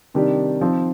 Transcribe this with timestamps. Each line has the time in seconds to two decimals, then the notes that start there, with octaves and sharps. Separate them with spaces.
0.14 C3 D#3 G3 D4 G4
0.61 F3 C4 D#4